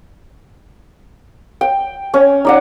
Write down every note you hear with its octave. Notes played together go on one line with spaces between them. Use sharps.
G5
C#4
D#4 D5 F#5